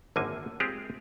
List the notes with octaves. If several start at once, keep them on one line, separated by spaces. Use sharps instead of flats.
G#1 F#2 D3 A#3 G#5
G#3 C4 F4 G4 G#4